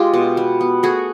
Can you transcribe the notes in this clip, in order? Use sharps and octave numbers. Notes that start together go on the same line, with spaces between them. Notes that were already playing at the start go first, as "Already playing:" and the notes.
Already playing: G#3 F4 G4
B2
B3
B3
A3 F#4 G#4